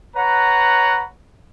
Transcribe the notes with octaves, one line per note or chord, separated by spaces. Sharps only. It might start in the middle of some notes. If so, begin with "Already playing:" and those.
B4 C#5 F#5 A#5